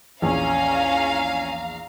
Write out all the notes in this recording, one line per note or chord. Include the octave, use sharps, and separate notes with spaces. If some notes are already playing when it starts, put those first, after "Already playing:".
A#1 E2 C#4 F5 G#5 A#5